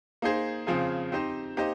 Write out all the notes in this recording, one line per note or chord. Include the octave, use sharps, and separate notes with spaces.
A#3 D#4 G#4 C5
C#3 F3 C4 F4 G#4
C4 D#4 G4 C5
A#3 D#4 G4 C5 D#5